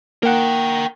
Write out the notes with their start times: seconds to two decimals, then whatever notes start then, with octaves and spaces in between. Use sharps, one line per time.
0.23 A#3 A#4 F#5 G5